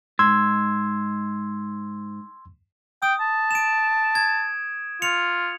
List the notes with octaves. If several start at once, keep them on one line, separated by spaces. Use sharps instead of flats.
G#2 C6 E6 G#6
G5 D#6
A5
D7 E7
G#6
F4 C#7 F7